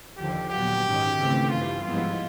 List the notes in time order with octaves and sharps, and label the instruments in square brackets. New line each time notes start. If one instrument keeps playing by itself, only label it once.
[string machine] D#2 D3 F3 [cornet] G4
[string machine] A#2 F#3 B3 [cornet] G4
[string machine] G#2 D#3 G#3 C#4
C#3 E3 A3 C4
[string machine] G2 E3 G3 [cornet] F4
[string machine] G#2 F3 G#3 B3 E4 [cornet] F4